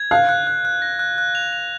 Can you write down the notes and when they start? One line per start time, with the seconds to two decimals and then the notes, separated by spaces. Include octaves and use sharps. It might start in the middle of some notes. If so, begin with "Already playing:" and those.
Already playing: G#6
0.11 F5 F#6
0.29 F#6
0.47 F#6
0.65 F#6
0.82 A#6
0.99 F#6
1.18 F#6
1.35 F7
1.53 F7